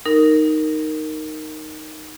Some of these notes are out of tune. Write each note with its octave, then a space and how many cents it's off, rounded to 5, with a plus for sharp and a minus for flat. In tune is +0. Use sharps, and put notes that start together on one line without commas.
D#4 +0 A#4 -10